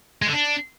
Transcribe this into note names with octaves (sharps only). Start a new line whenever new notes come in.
G#3
D3
D4